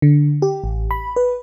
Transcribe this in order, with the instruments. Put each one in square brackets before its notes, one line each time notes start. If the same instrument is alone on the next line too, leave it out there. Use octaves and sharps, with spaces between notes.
[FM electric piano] D3
G4
A1
B5
B4